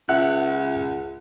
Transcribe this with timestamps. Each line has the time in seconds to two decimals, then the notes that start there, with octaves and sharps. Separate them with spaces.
0.09 C#2 E5 F#5 F#6